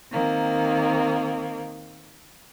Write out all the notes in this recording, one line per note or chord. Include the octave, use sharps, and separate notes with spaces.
D#3 A#3 C4